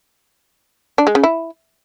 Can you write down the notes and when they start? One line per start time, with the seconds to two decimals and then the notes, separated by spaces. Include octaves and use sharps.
0.98 D4
1.07 G#3
1.15 C#3
1.23 E4